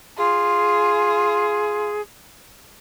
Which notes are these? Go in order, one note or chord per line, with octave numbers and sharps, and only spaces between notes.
F4 G#4